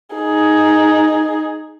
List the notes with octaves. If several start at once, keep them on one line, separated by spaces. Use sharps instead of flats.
D#4 G#4